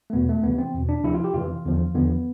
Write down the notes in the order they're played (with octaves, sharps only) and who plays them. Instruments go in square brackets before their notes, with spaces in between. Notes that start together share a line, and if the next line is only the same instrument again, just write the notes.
[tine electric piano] A3
E2 B2 B3
A3
D2 C3 E3 B3
C4
E2 B2
D4
D2 C3 F3 E4
F4
G4
F2 C3 E3 F4
E2 D3 F3
E2 D3 F3 B3